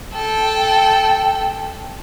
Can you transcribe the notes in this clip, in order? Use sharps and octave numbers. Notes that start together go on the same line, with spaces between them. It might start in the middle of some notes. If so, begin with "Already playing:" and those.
A4 G5